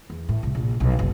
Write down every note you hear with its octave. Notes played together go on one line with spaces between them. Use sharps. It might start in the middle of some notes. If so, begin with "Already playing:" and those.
E2
A2
C2
A#1
B1
F#1